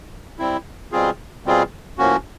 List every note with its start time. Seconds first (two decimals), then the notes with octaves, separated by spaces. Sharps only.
0.39 G3 C4 E4
0.92 B2 G3 C4 F4 G#4
1.45 B2 G3 C4 F4 G#4
1.98 A2 F3 A#3 C#4 F#4